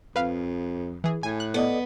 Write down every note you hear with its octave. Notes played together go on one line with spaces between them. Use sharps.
F2 B4 F5
E3 G#4
A2 G#5
F#6
B3 A4 D5 D#5